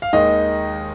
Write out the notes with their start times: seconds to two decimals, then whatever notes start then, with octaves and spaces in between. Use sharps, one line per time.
0.02 F5
0.13 D#2 D#3 G#3 D#5